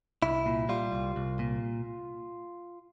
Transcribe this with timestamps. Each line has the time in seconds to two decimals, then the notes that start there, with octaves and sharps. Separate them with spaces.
0.23 C2 E4
0.46 A#2
0.69 G3 F4
0.92 C2
1.16 C2
1.39 A#2